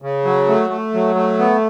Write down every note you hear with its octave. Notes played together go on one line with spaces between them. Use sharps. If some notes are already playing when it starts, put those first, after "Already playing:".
C#3
F#3
A3
A3
F#3
A3
B3